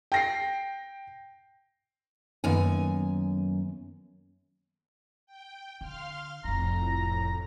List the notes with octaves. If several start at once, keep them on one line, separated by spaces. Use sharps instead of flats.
G5 A#6 C7
F#2 D#3 A#3 B3 G#5
G5
D3 F5 C6 F6
F1 F2 A2 G3 A#5